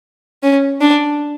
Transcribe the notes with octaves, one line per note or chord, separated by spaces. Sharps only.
C#4
D4